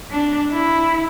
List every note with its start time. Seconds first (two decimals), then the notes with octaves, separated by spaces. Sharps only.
0.11 D4
0.52 E4